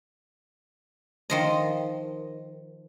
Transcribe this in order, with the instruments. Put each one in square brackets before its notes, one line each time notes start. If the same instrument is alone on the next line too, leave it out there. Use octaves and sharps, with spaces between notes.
[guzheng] D#3 F3 D#5